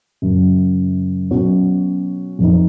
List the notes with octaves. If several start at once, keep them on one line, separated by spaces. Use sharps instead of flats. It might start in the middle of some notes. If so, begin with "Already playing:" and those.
F#2 C#3 F#3
B2 F#3 C#4 F#4
F2 F3 B3 D#4